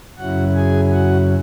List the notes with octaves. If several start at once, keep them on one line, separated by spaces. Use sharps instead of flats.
F#2 C#3 F#3 C#4 E4 F#4 F#5
G#4 G#5
F#4 F#5